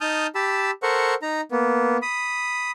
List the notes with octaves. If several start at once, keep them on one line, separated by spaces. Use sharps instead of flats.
D#4 A5 D#6 F6 G6
G4 A5 B5 E6
A4 A#4 C5 F#5 C#6
D#4 A#5
A#3 B3
B5 D#6